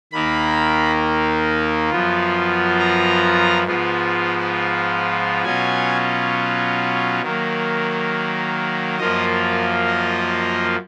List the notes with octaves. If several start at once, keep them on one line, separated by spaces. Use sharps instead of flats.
D#2 D#3 A#3 D#4 B5
F#2 F3 B3 F4
A#5
G#2 F3 B3 F4
B2 F#3 C#4 F4 G#5
D#3 F#3 A#3
F#2 F3 A#3 F4 D#5
D#5